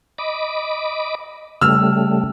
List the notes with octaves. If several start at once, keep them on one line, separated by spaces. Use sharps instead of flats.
D#5 B5 D6
C#3 G3 A3 E6 F6